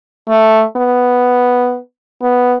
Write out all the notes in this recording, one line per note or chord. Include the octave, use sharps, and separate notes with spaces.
A3
B3
B3